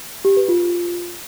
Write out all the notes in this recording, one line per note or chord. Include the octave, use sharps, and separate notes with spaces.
G4
B4
F4